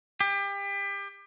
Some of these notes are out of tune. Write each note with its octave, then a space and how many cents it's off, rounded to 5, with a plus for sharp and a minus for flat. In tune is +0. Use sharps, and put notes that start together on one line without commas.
G4 +30